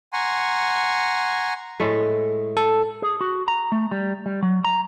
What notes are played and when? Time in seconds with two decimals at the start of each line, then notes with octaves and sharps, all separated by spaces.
0.13 F#5 G#5 A#5 C6 C#6
1.80 A2 G#3 A3
2.57 A4
3.02 G#4
3.21 F#4
3.48 A#5
3.72 A3
3.91 G3
4.26 G3
4.42 F#3
4.64 A#5